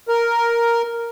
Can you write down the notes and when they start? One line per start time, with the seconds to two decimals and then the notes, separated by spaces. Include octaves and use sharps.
0.08 A#4